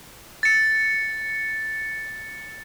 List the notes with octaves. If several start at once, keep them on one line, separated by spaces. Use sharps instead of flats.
A6 C#7